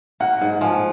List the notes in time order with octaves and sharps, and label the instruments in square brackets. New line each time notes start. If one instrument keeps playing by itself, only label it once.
[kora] A#3 [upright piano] F#5
[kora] G#2
[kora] F3 [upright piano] G#5